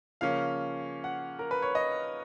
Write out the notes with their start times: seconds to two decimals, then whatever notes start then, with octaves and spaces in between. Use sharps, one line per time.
0.21 C#3 F3 A#3 C#4 F5
1.04 F#5
1.39 A#4
1.51 B4
1.62 C#5
1.75 D#5